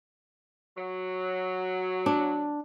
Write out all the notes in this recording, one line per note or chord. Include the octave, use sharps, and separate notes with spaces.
F#3
D4